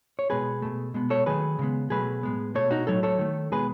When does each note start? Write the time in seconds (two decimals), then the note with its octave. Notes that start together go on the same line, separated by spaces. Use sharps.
0.19 C#5
0.30 B2 G#3 B3 G#4 B4
0.62 B2 A3
0.94 B2 G#3 B3
1.10 A4 C#5
1.26 D#3 F#3 A3 G#4 B4
1.59 C#3 G#3 B3
1.90 B2 F#3 A3 G#4 B4
2.23 A2 G#3 B3
2.55 B2 A3 A4 C#5
2.71 D#4 F#4
2.87 A2 F#3 A3 A4 C#5
3.03 A4 C#5
3.19 D#3 A3
3.52 B2 G#3 B3 G#4 B4